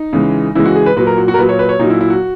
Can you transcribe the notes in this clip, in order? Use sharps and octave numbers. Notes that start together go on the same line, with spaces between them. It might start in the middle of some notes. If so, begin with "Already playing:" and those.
Already playing: D#4
C#3 E3 G#3
C#3 E3 G#3 E4
F#4
G#4
B4
A#2 F#3 B4
A#4
F#4
F#4
A#4
A#2 F#3 B4
C#5
B4
C#5
A#2 F#3 D#4
E4
E4
F#4